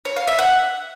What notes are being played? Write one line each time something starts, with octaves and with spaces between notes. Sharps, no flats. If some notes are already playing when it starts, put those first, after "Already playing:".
C#5
F5
E5
F#5